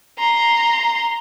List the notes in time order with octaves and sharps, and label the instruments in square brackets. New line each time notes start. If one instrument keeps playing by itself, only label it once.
[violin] A#5 C6